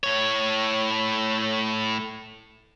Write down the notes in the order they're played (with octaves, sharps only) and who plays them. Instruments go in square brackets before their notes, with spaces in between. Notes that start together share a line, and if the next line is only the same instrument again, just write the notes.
[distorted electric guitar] A2 C#5